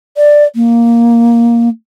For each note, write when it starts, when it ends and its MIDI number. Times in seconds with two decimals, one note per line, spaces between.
0.17 0.44 74
0.55 1.69 58